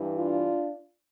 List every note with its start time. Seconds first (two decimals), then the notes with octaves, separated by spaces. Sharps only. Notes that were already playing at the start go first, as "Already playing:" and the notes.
Already playing: G2 E3
0.16 D4 F4